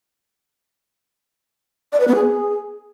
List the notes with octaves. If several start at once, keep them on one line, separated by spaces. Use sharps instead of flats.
D5
B4
B3
G#4